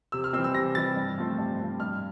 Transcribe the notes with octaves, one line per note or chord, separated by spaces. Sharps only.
C3 E6
F6
E3 G3 C4 E6
E6
C3 A#6
E3 G3 C4 A6
G2
F3 A3 C4
G2
F3 A3 C4
G2 F6